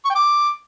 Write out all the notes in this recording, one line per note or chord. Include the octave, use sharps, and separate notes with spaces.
C#6
G5
D6